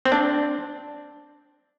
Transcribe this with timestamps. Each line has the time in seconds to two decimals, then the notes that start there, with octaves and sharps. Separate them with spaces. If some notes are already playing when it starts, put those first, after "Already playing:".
0.05 C4
0.12 D4